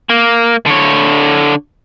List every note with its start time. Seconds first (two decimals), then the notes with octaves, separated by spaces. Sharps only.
0.10 A#3
0.66 D3 C#5